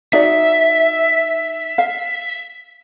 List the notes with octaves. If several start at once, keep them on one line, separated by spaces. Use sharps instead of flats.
D#4 F#4 D5 E5
F5